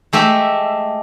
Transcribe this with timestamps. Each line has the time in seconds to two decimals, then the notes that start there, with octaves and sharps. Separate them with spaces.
0.13 G#3 A3 G4 E5